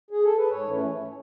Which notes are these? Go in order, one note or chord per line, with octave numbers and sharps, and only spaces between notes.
G#4
A4
B4
G#2 C#5
E3 A3 C#4